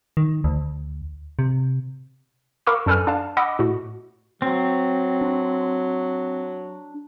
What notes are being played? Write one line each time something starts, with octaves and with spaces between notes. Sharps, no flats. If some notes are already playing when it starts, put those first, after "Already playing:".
D#3
D2
C3
A#4 F5 B5 C#6 D6 E6
F#2 D4 A4 B4 G#5 F6
D4 F5 A5
D#5 F#5 B5 D6 E6
A2 F#4
F#3 C4
D4